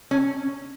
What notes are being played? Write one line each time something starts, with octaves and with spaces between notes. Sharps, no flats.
C#4